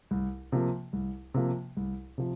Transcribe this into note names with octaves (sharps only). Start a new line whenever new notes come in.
C2
C3 F3 A#3
C2
C3 F3 A#3
C2
C3 F3